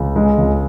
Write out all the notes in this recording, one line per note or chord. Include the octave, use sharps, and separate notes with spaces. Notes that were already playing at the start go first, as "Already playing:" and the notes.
Already playing: C#2
G#3
C#2